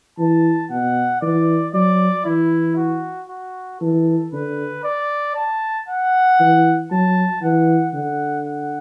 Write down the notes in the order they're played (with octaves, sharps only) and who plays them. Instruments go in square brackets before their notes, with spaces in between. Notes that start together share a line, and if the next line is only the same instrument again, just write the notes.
[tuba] E3 [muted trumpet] A5
[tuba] B2 [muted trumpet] F#5
[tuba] E3 [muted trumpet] D5
[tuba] F#3 [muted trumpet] D5
[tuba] E3 [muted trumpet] E4
[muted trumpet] F#4
F#4
[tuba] E3 [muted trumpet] A4
[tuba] D3 [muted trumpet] B4
[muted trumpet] D5
A5
F#5
[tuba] E3
[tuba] F#3 [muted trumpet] A5
[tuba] E3 [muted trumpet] F#5
[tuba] D3 [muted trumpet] F#5
[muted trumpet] F#5